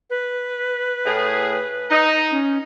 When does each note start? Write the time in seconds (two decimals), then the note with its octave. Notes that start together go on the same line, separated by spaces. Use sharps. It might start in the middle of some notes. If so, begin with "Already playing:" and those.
0.10 B4
1.05 A2 G#4
1.91 D#4
2.31 C#4